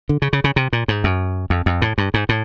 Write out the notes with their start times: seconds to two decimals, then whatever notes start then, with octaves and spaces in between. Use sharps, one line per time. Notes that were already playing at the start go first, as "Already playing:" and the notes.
0.09 D3
0.22 C#3
0.33 C#3
0.44 C#3
0.56 C3
0.73 A#2
0.88 G#2
1.04 F#2
1.50 F2
1.66 F2
1.82 A2
1.98 G2
2.14 G#2
2.29 A2